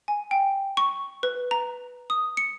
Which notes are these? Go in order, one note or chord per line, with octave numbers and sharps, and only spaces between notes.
G#5
G5
C#6
B4
A#5
D#6
C#7